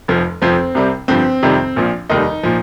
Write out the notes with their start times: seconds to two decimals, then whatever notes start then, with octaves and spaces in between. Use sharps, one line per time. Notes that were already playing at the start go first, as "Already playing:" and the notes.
0.08 F1 F2 F3
0.42 F1 F2 F3 C4
0.75 C2 C3 G3
1.08 G1 G2 F3 C4
1.43 F2 C3 D#3 G3
1.76 A#1 A#2 F3
2.09 F1 D#2 D#3 G3 D#4
2.43 A#2 F3